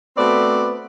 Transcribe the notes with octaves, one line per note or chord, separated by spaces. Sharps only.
A3 B3 C4 F#4 D5